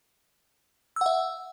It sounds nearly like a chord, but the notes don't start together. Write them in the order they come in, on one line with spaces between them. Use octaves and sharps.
E6 F#5 E5